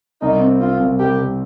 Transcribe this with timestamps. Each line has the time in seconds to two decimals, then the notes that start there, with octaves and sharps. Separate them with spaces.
0.21 C2 D#4
0.40 C4
0.60 C4 F4
0.80 C2
0.99 C2 G4
1.18 C2